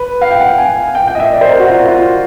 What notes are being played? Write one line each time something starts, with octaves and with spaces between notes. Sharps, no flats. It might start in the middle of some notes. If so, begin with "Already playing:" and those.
Already playing: B4
F5
G5
F#5
G#5
G5
G5
D#5
E5
D5
C5
A#4
F#4
F4
F4